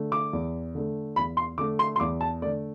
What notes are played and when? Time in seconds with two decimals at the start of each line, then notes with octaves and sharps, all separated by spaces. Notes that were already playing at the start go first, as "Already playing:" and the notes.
Already playing: D3 A3
0.12 D6
0.33 E2
0.75 D3 A3
1.16 E2 B5
1.37 C6
1.58 D3 A3 D6
1.79 C6
1.96 C6
2.00 E2 D6
2.21 A5
2.42 A3 D5
2.46 D3